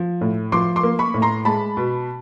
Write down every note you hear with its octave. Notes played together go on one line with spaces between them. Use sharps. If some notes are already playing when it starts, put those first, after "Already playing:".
Already playing: F3
A2
F3 C6 D6
C6 D6
A#3
B5 C#6
A2
A#5 C6
G#3 A5 B5
B2